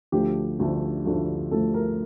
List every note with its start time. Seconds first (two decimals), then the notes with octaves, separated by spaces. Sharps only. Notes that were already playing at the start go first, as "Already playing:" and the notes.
0.12 D2 D3 F3 A3 G4
0.59 D2 D3 F3 A3
1.06 D2 D3 F3 A3
1.51 D2 D3 F3 A3 A4
1.74 A#4